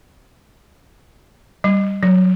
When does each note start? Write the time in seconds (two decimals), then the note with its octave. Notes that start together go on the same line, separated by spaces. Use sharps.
1.64 G3
2.03 F#3